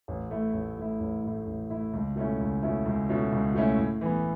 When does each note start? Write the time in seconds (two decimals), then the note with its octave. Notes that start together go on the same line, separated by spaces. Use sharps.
0.08 A1
0.31 A2 A3 E4
0.53 A1
0.77 A2 A3 E4
1.00 A1
1.23 A2 A3 E4
1.47 A1
1.70 A2 A3 E4
1.93 C#2
2.16 B2 A3 C#4 E4
2.40 C#2
2.62 B2 A3 C#4 E4
2.85 C#2
3.09 B2 A3 C#4 E4
3.32 C#2
3.55 B2 A3 C#4 E4
3.79 A2
4.01 E3 B3